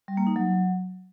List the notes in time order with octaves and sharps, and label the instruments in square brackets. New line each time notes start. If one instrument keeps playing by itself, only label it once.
[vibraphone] G3
A#3
D#4
F#3